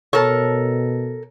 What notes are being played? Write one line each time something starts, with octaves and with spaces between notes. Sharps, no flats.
B2 A4 A#4 C#5 A5